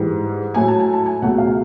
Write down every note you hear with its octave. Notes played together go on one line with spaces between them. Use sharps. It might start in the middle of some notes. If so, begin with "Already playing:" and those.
Already playing: G#2 E3 G3
A2 F#3 A3 G#5
A5
G#5
A5
G#5
C#2 B2 F#3 A3 F#5
F5